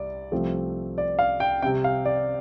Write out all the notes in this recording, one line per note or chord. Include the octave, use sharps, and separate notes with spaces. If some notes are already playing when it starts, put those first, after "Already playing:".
Already playing: C2 D5
C2 C3 F3 A3 C4
D5
F5
G5
C3 G3 C4 G5
F5
D5